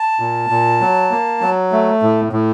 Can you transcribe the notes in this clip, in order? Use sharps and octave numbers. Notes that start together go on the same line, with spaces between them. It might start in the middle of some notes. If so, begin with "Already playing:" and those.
Already playing: A5
A#2
A#2
F#3
A#3
F#3
A3
A2
A2